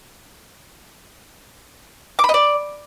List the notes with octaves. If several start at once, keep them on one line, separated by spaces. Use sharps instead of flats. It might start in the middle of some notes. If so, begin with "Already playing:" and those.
D6
B5
D#5
D5